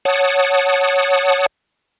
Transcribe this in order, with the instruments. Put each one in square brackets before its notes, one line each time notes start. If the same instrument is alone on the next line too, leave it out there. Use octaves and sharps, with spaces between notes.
[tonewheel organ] C#5 F#5 A5 D#6